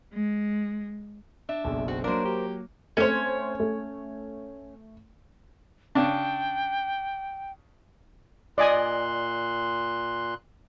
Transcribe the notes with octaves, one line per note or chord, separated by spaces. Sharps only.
G#3
D4 E5
F#1 B1
C4 F#4
F#3 A#3 D4 A#4 C5
G4
A3 C4 C#4 C5 C#5
A3
C#3 D4 G5
A#2 D5 D#5 G#5 C6 F#6